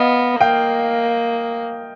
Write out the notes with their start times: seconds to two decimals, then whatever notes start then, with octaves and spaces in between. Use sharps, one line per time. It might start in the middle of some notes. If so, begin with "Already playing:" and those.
Already playing: B3 D#5 F5
0.41 A#3 F5 G5